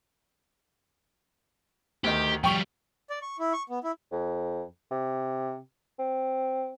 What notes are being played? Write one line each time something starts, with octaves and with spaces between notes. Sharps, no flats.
D2 D#3 G4
F3 G3 G5 C#6 F7
D5
C#6
E4
C#6
B3
E4
F2
C3
C4